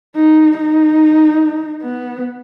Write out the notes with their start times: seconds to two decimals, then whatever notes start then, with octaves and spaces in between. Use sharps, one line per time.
0.16 D#4
0.57 D#4
1.83 B3